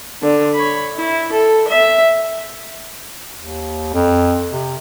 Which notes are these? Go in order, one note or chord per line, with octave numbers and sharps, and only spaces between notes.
D3
C#5 B5
E4
A4
E5
D#2
F2
C3